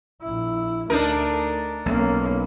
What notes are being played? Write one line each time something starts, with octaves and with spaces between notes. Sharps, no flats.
A#1 E4
D2 A3 D4 D#4 A#4
B1 A#3 C#4